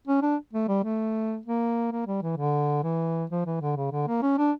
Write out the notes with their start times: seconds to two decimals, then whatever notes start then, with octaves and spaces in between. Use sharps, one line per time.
0.07 C#4
0.22 D4
0.53 A3
0.68 G3
0.84 A3
1.46 A#3
1.92 A#3
2.07 G3
2.22 E3
2.38 D3
2.84 E3
3.30 F3
3.46 E3
3.61 D3
3.76 C#3
3.92 D3
4.08 A#3
4.22 C#4
4.38 D4